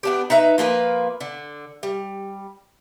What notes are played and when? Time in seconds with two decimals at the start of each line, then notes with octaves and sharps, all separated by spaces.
0.03 B3 D4 G4
0.30 D#4 B4 E5 A#5
0.58 F3 A#3 A#4 B4
1.20 D3
1.83 G3